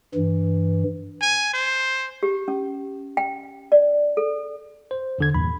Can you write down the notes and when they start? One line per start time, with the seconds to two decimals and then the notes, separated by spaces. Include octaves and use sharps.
0.15 G2 E3
1.22 G#5
1.53 C5
2.23 G4
2.48 C#4
3.17 G5
3.72 D5
4.17 A4
4.91 C5
5.18 E2 D3 G#6
5.34 E2 G2 A#2 B5